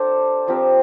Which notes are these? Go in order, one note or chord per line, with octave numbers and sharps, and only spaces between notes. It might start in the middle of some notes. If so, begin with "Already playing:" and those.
Already playing: D4 G4 A4 C5
F3 C4 G4 A#4